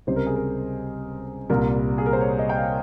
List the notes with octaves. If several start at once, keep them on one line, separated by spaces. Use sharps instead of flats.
C#2 C3 G3 C5
A#4
G#4
A#4
C2 A#2 G3 A#4
G#4
A#4
C5
C#5
D#5
G5
F5